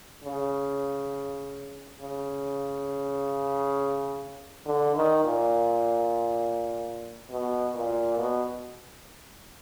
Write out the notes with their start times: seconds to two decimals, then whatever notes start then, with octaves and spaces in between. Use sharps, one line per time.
0.24 C#3
2.01 C#3
4.66 D3
4.95 D#3
5.24 A#2
7.30 B2
7.75 A#2
8.18 B2